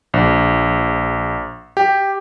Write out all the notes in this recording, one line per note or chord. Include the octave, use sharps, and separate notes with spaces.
A#1
G4